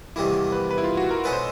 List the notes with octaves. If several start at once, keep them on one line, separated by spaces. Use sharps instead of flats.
E2 C3 D#3 G3 A#3 E4
B4
B4
E4
F4
F#4
A#4
B2 G#3 C#4 E4 A4 B4
C5